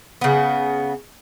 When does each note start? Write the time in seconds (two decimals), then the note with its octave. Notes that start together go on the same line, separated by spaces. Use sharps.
0.21 C#3 B3